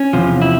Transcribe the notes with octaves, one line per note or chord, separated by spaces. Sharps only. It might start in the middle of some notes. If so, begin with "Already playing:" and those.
Already playing: C#4
E2 C3 F3
E4